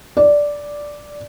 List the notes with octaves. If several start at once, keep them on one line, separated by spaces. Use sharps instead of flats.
D5